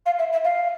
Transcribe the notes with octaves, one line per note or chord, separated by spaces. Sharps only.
F5
E5
E5
F5